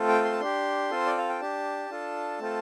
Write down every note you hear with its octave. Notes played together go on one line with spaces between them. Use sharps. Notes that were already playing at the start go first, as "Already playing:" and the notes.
Already playing: A3 C4 F4 A4
G5
C6
A5
D4 G4 C6
C4 F4 A4 C5
D5
F5
G5
D4 G4 A5
D4 F4 A4
A3 C4 F4 A4